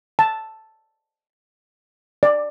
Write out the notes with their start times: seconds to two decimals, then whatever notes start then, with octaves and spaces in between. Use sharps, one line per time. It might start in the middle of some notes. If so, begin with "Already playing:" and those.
0.19 A5
2.23 D5